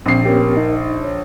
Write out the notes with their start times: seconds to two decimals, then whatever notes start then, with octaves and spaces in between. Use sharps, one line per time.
0.06 A#1 C4 C7
0.25 B3 C#4 G4 A#4
0.57 D#4
1.02 C#5